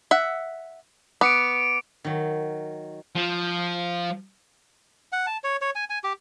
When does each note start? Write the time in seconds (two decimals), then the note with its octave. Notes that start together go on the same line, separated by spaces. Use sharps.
0.11 E5 F#5
1.21 B3 D6 C#7 D7
2.04 D#3 F#3
3.15 F3
5.12 F#5
5.27 A5
5.44 C#5
5.61 C#5
5.75 G#5
5.90 G#5
6.04 G4